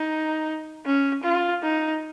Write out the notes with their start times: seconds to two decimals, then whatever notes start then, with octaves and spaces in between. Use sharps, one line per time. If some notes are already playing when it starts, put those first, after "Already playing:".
Already playing: D#4
0.86 C#4
1.24 F4
1.63 D#4